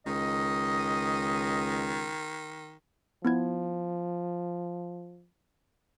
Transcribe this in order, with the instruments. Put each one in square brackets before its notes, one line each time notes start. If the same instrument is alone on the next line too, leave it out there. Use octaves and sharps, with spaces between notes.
[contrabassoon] C#2 [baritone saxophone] D#3 [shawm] D#5
[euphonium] F3 [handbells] B3 E4 G#6